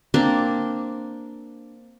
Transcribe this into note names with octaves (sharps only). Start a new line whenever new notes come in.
A#3 C4 D4